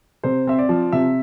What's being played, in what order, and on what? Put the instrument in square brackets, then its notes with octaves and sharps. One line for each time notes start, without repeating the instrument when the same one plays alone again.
[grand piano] C3 C5
C4 E5
D5
F3
C3 E5